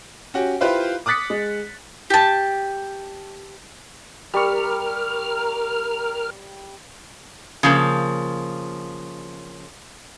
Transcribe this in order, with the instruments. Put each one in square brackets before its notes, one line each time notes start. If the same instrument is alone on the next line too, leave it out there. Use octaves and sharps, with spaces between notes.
[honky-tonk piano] C#4 F#4 G4
E4 F4 G4 B4 C5 F5
D6 D#6 F#6 A6 B6 C#7
G#3
[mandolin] G4 A5
[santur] G3 C#6 [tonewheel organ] A#4 F6
[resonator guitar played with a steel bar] C#3 F3 A#3